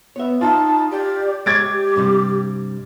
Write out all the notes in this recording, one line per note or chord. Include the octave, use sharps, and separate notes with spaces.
B3 C#5 E5
D#4 F4 A5
G4 D5
G#3 G4 C#5 D6 G#6 A6 D7
G2 C3 G3